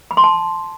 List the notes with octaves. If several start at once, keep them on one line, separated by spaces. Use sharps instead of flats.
B5
C6
A5